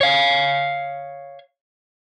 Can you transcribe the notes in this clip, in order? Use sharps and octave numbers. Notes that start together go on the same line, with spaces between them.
C#5 F5